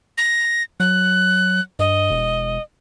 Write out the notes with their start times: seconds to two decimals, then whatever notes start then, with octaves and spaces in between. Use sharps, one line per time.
0.18 A#6
0.80 F#3 F#6
1.79 G2 D#5
2.11 E1